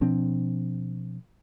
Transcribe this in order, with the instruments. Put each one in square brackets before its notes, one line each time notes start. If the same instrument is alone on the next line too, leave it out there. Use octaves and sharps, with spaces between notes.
[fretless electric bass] B2 F3 C4 D4